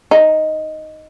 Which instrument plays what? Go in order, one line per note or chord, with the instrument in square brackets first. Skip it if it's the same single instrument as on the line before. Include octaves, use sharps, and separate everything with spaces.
[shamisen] D#4